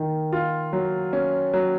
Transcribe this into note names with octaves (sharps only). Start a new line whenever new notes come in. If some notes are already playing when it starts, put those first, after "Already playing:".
Already playing: D#3
F4
F#3
C#4
F#3